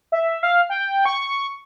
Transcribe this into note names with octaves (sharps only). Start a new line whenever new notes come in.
E5
F5
G5
C#6